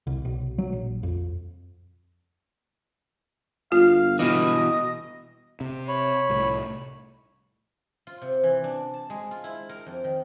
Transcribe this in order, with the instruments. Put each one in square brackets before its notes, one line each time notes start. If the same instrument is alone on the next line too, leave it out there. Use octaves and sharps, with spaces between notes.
[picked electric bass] C2
B1
F#3
A#1
F2
[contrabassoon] G1 [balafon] F4 [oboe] F5
[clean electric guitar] B2 E3 [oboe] D#5
[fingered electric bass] C3
[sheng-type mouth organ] C#5 B5
[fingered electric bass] C2 A2
[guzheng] F4
C3
E3
D4
A5
G#3
F4
E4
A#4
F2
D#3